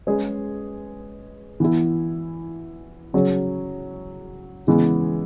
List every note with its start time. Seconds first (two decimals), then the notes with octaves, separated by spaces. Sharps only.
0.07 G#3 C#4 G#4 B4
1.60 E3 B3 E4
3.14 C#3 F#3 C#4 G#4 C#5
4.67 C#3 E3 G#3 B3